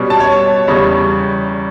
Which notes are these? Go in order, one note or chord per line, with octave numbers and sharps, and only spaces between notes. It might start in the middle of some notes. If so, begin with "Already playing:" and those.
Already playing: B2 G3 C#4
A5
C#5
E2 C#3 G3 C#4